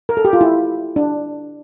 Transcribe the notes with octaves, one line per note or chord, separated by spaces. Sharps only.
A#4
A4
G4
F4
E4
D4